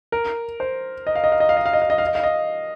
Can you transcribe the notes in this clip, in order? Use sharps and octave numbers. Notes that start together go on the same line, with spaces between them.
A#4
C5
D#5
F5
D#5
F5
D#5
F5
D#5
F5
D#5
F5
D#5
F5
D#5
F5
D#5